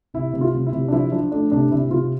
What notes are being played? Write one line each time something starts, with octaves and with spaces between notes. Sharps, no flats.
C3 E4
C3
F4
C3
E4
C3
D4
F3 E4
F3 D4
A3 D4
C3 D4
C3 E4
C3 F4